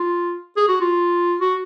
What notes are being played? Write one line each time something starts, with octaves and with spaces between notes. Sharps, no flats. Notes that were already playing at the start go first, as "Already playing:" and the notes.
Already playing: F4
G#4
F#4
F4
F#4